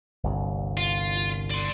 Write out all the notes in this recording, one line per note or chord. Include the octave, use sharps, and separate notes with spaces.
G1 C2
F4
D5 C6